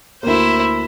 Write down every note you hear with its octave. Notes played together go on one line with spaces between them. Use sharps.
D2 A#3 E4 C5